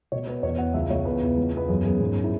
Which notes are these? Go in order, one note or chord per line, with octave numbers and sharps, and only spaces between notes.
B2 C#5
B3 B4
E2 C#5
E2 F#5
C#2 E5
C#2 C#5
E2 B4
E2
C#2
B3 B4
F#2 G#4
F#2 G#4
G#2
E4